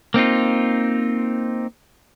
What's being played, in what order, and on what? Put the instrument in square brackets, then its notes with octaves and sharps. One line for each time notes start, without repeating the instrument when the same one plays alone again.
[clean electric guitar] A#3 C4 D#4 F4